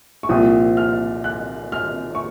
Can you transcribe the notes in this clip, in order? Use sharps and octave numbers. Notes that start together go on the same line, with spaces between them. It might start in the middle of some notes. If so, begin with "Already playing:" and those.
C#6
C2 A#2 F3 C4 D#6
F6
F#6
F6
C#6